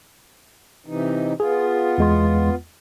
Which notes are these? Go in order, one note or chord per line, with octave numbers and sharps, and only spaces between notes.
C3 E3 D#4
B3 F4 G#4
E2 G#3 C6